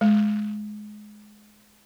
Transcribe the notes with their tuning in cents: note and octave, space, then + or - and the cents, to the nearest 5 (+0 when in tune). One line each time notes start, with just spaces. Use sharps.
G#3 +20